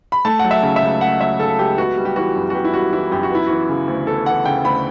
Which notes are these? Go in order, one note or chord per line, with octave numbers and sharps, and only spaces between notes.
B5
A3 A5
F#3 F#5
E5
C#3
E5
C#2
A3 F#5
F#3 E5
C#3 A4
C#2 G4
B3 F#4
G3
G4
E3 F#4
F#2
F#4
B3 G4
E4
G3 F#4
E3 E4
F#2 G4
F#4
B3 E4
E3 F#4
C#3
D2
B3 A4
E3 F#5
C#3 G5
D2 B5